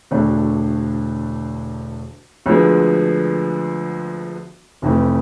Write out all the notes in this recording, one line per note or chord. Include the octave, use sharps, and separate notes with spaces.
E1 D2 D3 A3 D4
D2 D3 F3 G#3 B3
F1 F2 E3 A3